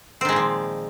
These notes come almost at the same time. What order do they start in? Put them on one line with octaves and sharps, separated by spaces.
C4 D#3 G#3 A#2 F3